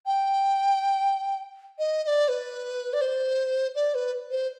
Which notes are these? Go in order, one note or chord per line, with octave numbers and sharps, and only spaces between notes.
G5
D#5
D#5
D5
B4
D5
C5
D5
B4
C5